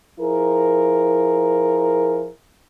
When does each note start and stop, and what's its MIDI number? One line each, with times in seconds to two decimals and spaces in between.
0.20 2.28 53
0.20 2.28 64
0.20 2.28 68
0.20 2.28 70